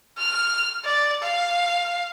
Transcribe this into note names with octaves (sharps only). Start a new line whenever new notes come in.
F6
D5
F5